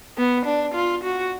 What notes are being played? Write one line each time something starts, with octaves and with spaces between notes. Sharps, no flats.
B3
D4
F4
F#4